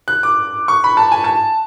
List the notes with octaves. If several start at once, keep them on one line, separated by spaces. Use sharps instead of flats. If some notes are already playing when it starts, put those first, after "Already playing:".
F#6
D6
C#6
B5
A5
G#5
A5